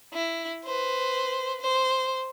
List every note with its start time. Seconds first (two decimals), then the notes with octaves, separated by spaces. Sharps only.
0.14 E4
0.64 B4 C5
1.61 C5